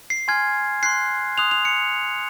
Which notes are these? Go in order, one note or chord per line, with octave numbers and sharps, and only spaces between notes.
C7
G#5 C6 F6 G#6
C6 F#6 C7
C6 D#6 F#6 F7
F7
C#7